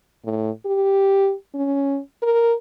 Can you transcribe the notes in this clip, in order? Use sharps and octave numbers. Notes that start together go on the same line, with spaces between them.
A2
G4
C#4
A#4